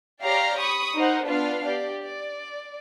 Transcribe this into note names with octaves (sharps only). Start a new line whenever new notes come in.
G4 C#5 D5 F5 A#5
B5 C#6 D#6
D#4 A#4 C5 F#5
B3 D4 F4 B4 F5
G4 D5
D5